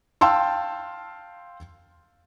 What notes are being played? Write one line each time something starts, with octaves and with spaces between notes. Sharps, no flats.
F5 G5 A5 C6 E6